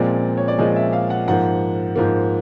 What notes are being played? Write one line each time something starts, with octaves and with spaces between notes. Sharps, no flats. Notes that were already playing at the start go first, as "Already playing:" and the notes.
Already playing: A#2 F3 G#3 C4 D5
C#5
D5
A#2 F3 G#3 C4 D#5
E5
F5
F#5
G#2 F3 A#3 F#5
G#2 F3 A#3